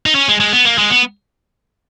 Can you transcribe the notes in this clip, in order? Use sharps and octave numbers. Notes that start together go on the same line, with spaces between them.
D#4
C#4
G#3
G#3
B3
A#3
G#3
B3